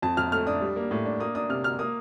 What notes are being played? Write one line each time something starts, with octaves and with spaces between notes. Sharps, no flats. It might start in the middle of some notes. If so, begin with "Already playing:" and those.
F2 A5
F2 F6
A3 F6
D4 D#6
G3
A#3
A2
D4
A#3 D#6
D4 D#6
C3 F6
A#3 F6
A#3 D#6